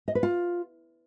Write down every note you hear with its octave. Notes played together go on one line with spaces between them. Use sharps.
D#5
B4
F4